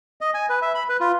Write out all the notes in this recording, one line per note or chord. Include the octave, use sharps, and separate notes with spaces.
D#5
G#5
B4
E5
B5
B4
F4